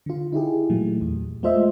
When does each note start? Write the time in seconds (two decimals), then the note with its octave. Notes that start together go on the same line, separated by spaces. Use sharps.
0.06 D3 F4
0.32 D#4 E4 G4 G#4
0.70 A#2 E3 F#3 A3
1.01 E2
1.43 G#3 A3 F4 C5 D#5 E5